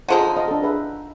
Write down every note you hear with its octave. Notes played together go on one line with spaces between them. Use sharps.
D3 F3 D#4 G#4 A4 F#5
C5 D#5 F5
D4 A4
G#4 B4 E5